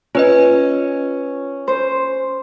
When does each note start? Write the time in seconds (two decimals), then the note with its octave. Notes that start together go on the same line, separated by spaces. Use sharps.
0.15 C#4 F4 B4 D#5
1.68 C5